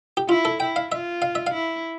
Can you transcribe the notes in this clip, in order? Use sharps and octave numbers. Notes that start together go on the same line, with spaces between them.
G4
E4 F4
A4
E4 G5
F5
F4 E5
F5
E5
F5
E4